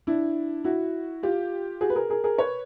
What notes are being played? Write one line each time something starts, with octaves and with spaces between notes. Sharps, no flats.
D4 E4
E4 F#4
F4 G4
F#4 G#4
B4
G#4 A#4
G#4 A#4
G#4 A#4
B4 C#5